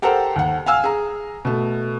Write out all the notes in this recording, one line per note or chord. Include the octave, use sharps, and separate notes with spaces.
G4 A4 A#4 C5 F#5
D#2 F#5
F5 G#5 E6 F6
G#4 A#5
B2 A3